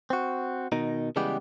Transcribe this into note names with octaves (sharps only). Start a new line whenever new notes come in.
C4 F#4
B2 D#3 D#4
C#3 E3 G3 G#3 B3 G4